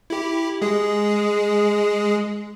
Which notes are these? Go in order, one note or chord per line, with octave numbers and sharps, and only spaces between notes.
E4 G4
G#3 G#4